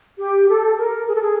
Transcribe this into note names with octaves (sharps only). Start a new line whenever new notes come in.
G4
A4
A#4
G#4
A4
G#4